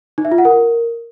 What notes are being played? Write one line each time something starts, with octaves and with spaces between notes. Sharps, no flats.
D#4
E5
F4
F#5
A#4